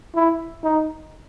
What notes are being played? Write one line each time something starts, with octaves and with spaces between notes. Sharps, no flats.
E4
D#4